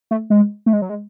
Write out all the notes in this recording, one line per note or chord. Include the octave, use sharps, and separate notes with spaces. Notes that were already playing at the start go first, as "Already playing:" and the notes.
A3
G#3
A3
G#3
F#3
G#3